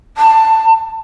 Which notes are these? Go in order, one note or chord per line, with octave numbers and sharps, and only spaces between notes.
A5